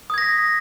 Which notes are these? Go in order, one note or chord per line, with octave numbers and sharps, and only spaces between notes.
D#6 G#6 A#6 B6